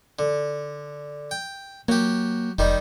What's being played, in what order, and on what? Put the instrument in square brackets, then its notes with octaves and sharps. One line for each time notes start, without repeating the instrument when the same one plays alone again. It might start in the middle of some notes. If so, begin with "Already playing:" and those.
[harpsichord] D3
G5
[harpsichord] F#3 G4 [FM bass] A#3
[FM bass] F1 [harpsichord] D#3 G3 D#4